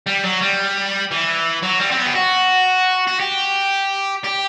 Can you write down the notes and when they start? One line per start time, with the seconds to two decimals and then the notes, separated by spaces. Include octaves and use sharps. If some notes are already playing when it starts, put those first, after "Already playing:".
0.06 G3
0.23 F#3
0.41 G3
1.11 E3
1.63 F#3
1.80 G3
1.91 C4
1.97 B3
2.06 G4
2.15 F#4
3.07 F#4
3.20 G4
4.24 G4